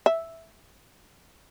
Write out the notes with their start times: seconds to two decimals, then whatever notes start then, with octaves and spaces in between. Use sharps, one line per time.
0.06 E5